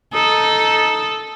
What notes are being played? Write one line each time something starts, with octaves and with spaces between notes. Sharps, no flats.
D#4 A4